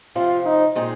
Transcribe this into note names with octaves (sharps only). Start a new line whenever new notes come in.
C3 F3 C4 F4
D#4
A#2 G#3 C4 D#4